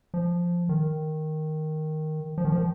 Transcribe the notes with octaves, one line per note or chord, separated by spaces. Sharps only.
F3
D#3
F3
D#3
F3